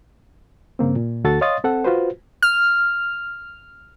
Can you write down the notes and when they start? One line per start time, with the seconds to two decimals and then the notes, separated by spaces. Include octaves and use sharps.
0.79 G2 C#3 A#3 C4
0.96 A#2
1.24 D2 F#4 A4 A6
1.41 C#5 D#5 F5 C6 D#6 A6
1.64 C4 A4 F#5
1.84 F4 F#4 B4 C5
2.43 F6